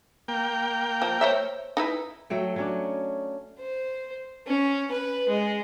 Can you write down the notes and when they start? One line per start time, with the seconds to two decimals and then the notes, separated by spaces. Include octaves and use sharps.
0.28 A#3 G5
1.02 F3
1.21 C5 C#5 E5
1.77 D#4 E4 B4
2.30 F#3 A3 G5
2.56 F#3 C#4 D4
3.59 C5
4.47 C#4
4.91 B4
5.29 G#3